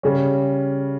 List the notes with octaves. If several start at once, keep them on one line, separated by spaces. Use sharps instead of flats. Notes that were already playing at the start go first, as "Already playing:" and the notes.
C#3 G3 C#4